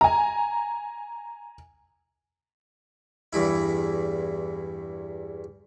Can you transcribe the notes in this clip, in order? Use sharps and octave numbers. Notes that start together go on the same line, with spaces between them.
G#5 A#5
E2 G2 E4